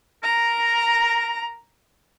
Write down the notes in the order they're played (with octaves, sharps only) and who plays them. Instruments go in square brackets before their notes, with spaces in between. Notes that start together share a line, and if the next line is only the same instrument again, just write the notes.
[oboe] A#4 [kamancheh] A#5